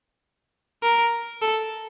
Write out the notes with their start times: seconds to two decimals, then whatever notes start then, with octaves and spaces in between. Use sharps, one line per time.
0.83 A#4
1.42 A4